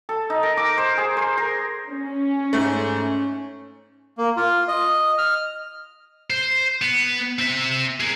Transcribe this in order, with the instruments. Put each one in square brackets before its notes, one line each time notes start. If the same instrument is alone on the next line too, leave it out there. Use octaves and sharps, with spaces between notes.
[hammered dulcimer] A4
D#4
A#4
D6
C5
G#4
C5
A#4
[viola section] C#4
[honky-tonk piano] G#2 A3
[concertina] A#3
F4
D#5
F6
[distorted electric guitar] C5
B3
C4 E5
G#4 A#4